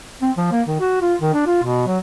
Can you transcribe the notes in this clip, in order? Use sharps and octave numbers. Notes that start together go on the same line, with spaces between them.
C4
F3
A#3
D#3
F#4
F4
D#3
D4
F4
B2
F#3